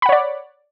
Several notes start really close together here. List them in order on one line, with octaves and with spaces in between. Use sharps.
B5 F#5 C#5 D5